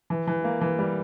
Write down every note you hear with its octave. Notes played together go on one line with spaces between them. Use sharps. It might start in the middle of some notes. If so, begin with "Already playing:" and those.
E3
E3
A#3
E3
G3